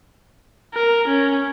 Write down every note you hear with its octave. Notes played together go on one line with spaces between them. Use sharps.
A#4
C#4